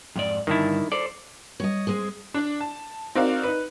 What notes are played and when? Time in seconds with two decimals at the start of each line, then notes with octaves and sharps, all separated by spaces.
0.16 F2 G#2 D5
0.47 G2 D3 D#3 E4 A5
0.92 A4 C5 D5
1.60 G3 C#5 D#5
1.87 G#3 C4 G#4
2.34 D4 D5
2.60 A5
3.15 C4 D#4 F#4 A#4 D5 F5
3.43 D#4 B4